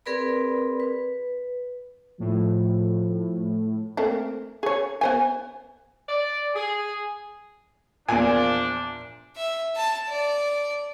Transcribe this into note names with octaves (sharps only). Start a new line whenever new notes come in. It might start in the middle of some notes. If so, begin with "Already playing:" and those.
C4 G#4 A#4 B4 D5 B5
B4
A2 F3
A3 A#3 C4
G#4 C#5
B3 C5 G#5
D5
G#4
E2 A#2 F3 D4 G#5
E5
A5
D5